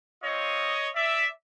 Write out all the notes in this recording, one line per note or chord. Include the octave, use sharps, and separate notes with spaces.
C4 F4 C#5 D#5
D5 E5